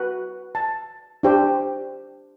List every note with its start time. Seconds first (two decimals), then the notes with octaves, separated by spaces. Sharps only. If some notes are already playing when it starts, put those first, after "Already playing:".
Already playing: F#4 B4
0.55 A5
1.23 D4 G4 C5